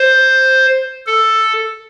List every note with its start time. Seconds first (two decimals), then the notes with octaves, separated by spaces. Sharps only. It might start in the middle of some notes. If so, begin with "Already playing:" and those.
Already playing: C5
1.06 A4